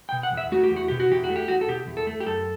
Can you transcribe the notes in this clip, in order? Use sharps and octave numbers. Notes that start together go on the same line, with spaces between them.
G5
B2
F#5
E2
E5
A3 F#4
G4
E2
F#4
B2 G4
F#4
E2 G4
F#4
A3
G4
E2 F#4
A4
B2 G4
E2
A4
A3
G4
F#2 A4